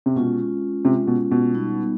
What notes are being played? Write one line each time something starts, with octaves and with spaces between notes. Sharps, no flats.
C3
B2 G#3 C#4 F4
C3 G#3 C#4 F4
B2
B2
G3 B3 D#4